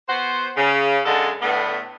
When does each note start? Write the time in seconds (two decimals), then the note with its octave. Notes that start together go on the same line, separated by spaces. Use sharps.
0.07 B3 F#4 C5
0.56 C#3
1.05 F#2 D3 G#3 A4
1.41 A2 D3 B3